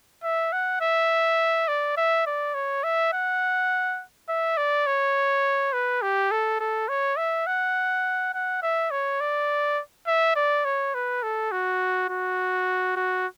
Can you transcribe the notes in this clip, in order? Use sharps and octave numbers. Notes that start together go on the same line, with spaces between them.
E5
F#5
E5
D5
E5
D5
C#5
E5
F#5
E5
D5
C#5
B4
G4
A4
A4
C#5
E5
F#5
F#5
E5
C#5
D5
E5
D5
C#5
B4
A4
F#4
F#4
F#4